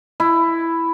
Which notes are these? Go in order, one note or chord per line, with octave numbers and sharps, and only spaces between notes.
E4